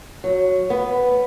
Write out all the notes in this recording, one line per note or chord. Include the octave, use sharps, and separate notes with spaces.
F#3
B3